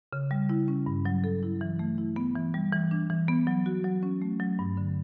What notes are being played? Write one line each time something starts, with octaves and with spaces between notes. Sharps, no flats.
C#3
G3
E4
C#4
G2
F#3
A4
E4
E3
A3
E4
B3
E3
G3
E3
D4
E3
B3
F#3
F#4
F#3
C#4
A3
F#3
G2
D3